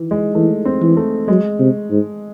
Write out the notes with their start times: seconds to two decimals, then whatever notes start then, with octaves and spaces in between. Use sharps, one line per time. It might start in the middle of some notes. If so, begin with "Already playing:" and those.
Already playing: D#3 E3
0.11 G#3
0.35 E3 A3
0.65 C4
0.82 E3
0.97 A3
1.28 F#3 G#3
1.59 C3
1.91 G#2